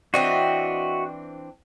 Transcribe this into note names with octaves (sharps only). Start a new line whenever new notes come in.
E3 C4 D4 F#4 D#5 E5